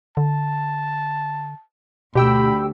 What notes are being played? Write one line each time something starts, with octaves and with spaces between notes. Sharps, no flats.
D3 A5
D2 B2 G4 G5 B5 E6